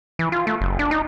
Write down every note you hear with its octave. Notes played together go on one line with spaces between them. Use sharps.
E3
F4
A3
F#1
D4
D#4